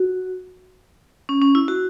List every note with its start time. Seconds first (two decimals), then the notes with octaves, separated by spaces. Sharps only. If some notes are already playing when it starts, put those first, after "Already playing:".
Already playing: F#4
1.29 C#4
1.42 C#4
1.55 E4
1.68 F#4